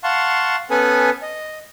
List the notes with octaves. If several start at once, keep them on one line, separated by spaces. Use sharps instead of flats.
F5 F#5 A5 C6 C#6
B3 C#4 A4 B4 G#5 D#6
D#5